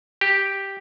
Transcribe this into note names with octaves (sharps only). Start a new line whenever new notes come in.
G4